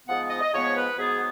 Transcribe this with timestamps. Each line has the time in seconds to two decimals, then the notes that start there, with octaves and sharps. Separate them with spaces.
0.07 G#2 F3 B3 F#5
0.30 D#5
0.41 D#5
0.52 G#2 F3 B3 C#5
0.75 B4
0.97 G#2 F#3 B3 G#4